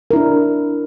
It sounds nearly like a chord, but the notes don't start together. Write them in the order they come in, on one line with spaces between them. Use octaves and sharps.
A#4 E4 D4